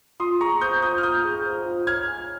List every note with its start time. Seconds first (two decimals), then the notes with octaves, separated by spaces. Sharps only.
0.20 F4 C6 D#6
0.41 G#4 A#5 C#6
0.61 C5 D#6 G6
0.82 F4 D#6 G6
0.98 F6
1.03 F4 D#6 G6
1.25 G#4
1.46 C5
1.66 F4
1.87 C#5 F6 G#6
2.08 G#5